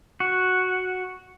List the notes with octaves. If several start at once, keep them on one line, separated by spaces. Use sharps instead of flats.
F#4